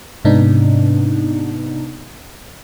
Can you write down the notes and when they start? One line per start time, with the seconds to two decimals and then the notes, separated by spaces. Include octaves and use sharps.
0.25 G#2 C3 B3 D4 D#4